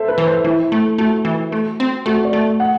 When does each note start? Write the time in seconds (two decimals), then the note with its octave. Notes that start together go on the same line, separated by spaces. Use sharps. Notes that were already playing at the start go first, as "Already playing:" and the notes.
Already playing: A4 C5 E5
0.08 B4
0.18 E3
0.26 C5
0.44 E3 E4
0.72 A3
0.98 A3 F#4
1.25 E3
1.52 A3
1.80 C4
2.06 A3 F#4
2.25 D5
2.33 A3
2.60 F#5